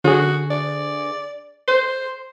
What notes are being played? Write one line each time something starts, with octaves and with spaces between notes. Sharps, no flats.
D3 F#4 G#4
D5
C5 C6